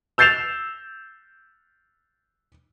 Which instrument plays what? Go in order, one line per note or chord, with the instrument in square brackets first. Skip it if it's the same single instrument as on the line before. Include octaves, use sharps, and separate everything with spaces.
[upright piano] E6 G6 A6 C7 E7 F7